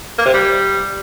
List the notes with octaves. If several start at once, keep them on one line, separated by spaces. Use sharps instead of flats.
A#3
C3
G3